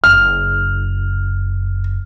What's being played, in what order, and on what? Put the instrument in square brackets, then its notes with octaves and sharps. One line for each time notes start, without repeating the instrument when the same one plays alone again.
[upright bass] F#1 [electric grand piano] F6